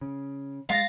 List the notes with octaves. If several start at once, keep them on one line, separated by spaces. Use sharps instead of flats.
C#3
G#3 F5 A6 A#6